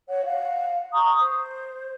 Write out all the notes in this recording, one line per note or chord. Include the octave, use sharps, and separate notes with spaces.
C#5 F#5
F5 F#5
A#5 C#6 D#6
C5